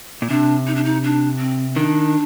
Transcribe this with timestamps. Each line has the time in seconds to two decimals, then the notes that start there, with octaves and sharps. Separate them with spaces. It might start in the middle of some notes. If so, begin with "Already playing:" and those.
0.22 A#2
0.30 C3 D4
0.67 D#4
0.75 D4
0.84 D#4
1.03 D4
1.39 C4
1.76 D#3 D4